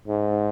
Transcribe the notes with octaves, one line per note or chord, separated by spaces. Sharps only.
G#2